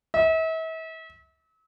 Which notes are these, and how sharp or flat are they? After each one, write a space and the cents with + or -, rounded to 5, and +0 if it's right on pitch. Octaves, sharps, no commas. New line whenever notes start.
E5 -40